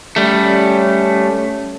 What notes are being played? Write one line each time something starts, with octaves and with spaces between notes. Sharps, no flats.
G3 A3 C#4